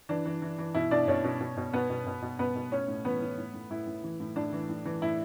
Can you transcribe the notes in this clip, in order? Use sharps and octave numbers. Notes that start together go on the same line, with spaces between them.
E3 D4
E3
E3
E3
B2 E4
B2 D4 D5
B2 C#4 C#5
B2
B2
B2
B2 B3 B4
B2
B2
B2
B2 B3 B4
B2
A2 C#4 C#5
A2
E3 B3 B4
A2
A2
A2
A2 E4
A2
E3
A2
A2 D4
E3
A2
E3
A2 E4